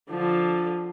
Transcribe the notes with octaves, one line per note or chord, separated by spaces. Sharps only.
D3 F3